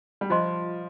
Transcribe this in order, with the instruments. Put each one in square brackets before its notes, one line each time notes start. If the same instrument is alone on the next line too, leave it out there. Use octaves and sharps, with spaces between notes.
[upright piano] G3
[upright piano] F3 [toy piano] F4 C5 D#5 C6